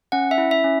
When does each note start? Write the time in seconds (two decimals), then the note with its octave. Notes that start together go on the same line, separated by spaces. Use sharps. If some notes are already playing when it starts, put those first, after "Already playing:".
0.12 C#4 F#5
0.31 E5
0.38 E4
0.51 E5
0.64 C#4